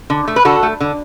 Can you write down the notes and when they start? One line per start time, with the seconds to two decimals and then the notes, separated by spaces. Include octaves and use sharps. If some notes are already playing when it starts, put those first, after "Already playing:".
0.10 D3
0.28 A3
0.36 B4
0.45 D3 F#4 A4
0.63 A3
0.80 D3